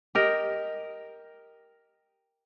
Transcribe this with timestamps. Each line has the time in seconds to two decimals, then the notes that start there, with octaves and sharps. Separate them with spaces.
0.15 G4 A#4 D#5